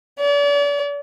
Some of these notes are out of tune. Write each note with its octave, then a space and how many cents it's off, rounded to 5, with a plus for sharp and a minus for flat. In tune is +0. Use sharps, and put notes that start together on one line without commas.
D5 -40